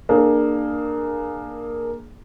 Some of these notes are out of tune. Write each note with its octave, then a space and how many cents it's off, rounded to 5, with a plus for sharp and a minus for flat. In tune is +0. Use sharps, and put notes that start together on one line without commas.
A#3 +0 D4 +25 G#4 +20